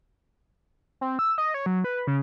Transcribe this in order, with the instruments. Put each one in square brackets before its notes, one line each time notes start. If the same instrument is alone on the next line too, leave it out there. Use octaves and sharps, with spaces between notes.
[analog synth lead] C4
E6
D#5
C#5
F#3
B4
C#3